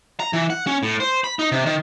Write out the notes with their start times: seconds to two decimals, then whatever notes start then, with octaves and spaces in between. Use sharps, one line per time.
0.20 A#5
0.33 E3
0.50 F#5
0.67 C#4
0.83 A2
1.00 C5
1.24 B5
1.39 D#4
1.52 C3
1.66 D#3